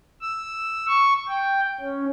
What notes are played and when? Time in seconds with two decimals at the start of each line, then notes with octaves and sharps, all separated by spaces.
0.21 E6
0.88 C#6
1.28 G5
1.80 C#4